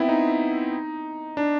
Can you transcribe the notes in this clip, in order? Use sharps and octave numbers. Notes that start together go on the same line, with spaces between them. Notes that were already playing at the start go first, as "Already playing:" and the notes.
Already playing: B3 C4 E4
D#4
D4